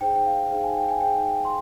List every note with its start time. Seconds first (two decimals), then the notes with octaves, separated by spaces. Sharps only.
0.01 D#4 G#4 C5 G5
0.16 G5
0.26 F5
0.51 D#4 G#4 C5 F5
0.64 G#5
0.77 G5
0.88 G#5
1.01 D#4 G#4 C5 G5
1.26 G5
1.45 C6